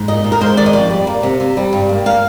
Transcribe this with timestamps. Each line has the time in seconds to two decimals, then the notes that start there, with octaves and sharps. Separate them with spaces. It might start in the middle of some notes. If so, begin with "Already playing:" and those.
Already playing: G#2
0.08 A#2 D#5
0.24 A#2
0.32 A#4
0.41 G#3 C5
0.57 D#3 D5
0.66 D#5
0.73 F2 D5
0.91 G3
1.07 A#3
1.23 C3
1.40 C3
1.57 G3
1.73 G2
1.89 A#3
2.06 A#3 F5